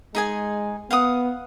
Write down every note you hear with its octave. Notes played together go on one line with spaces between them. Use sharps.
G#3 D#4 G#4 G#5
B3 F5 F#5 D#6